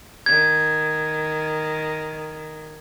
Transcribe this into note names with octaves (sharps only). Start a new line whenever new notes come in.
D#3 G#6